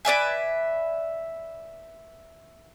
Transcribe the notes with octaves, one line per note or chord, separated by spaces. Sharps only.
B4 D5 E5 G#5